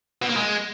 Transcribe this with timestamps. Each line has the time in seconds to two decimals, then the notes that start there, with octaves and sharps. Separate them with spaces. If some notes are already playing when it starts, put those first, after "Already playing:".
0.22 B2
0.29 A#3
0.37 G#3